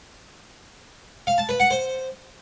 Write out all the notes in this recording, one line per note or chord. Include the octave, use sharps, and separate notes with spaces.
F5
A5
B4
F#5
C5